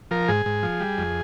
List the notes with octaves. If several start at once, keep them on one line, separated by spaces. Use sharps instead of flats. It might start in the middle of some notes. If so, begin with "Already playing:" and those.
F3 A#4
G#2 G#4
G#2
F3
G3
F2